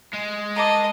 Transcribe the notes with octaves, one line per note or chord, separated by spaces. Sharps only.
G#3
A#4 D#5 A5 D6